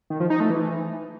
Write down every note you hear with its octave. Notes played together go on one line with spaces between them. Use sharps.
D#3
F3
D#4
A3
E3